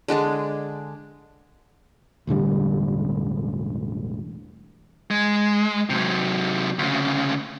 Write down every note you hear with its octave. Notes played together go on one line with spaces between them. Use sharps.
D3 G#3 D4 G#4
E1 A1 D3 G3
G#3
C3 F#3
D2 C#3